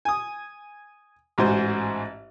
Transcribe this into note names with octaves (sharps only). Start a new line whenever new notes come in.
G#5 D#6
A1 G#2 F#4 C5 G#5